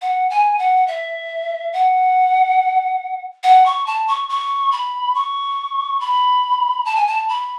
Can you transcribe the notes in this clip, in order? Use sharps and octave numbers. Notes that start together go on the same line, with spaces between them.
F#5
G#5
F#5
E5
F#5
F#5
C#6
A5
C#6
C#6
B5
C#6
B5
A5
G#5
A5
B5